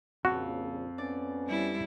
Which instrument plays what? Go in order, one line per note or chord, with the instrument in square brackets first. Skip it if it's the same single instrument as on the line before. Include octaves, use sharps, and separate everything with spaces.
[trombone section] A#1 A#2 C#3 [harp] F2 [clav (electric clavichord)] F#4
[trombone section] B3 C#4 [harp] D5
[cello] G3 E4